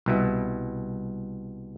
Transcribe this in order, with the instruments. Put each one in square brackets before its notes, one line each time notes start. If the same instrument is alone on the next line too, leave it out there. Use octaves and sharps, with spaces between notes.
[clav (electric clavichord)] C2 B2 E5